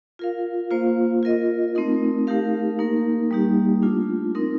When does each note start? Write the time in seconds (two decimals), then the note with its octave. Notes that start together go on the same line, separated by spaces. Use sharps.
0.19 F4 A#4 F5
0.71 A#3 F4 C5 F5
1.23 F4 A#4 D#5
1.75 A3 C4 D#4 A#4
2.27 A3 D#4 G4 A#4 F5
2.79 A#3 D#4 A#4
3.31 G3 A#3 D#4 G4
3.82 A3 D4 F4
4.35 C4 D#4 A#4